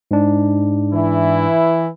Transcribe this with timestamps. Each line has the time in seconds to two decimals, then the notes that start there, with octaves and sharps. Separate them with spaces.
0.11 G#2 D4
0.93 E3 E4